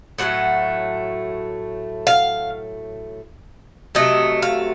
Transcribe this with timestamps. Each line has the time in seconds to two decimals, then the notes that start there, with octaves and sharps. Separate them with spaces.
0.18 A2 F#3 A3 F#5
2.07 F5
3.95 C3 F#3 A3 D#5
4.42 F5